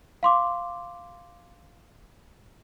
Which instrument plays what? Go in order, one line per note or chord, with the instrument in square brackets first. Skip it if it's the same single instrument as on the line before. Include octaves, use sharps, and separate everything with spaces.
[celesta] F5 C6 D6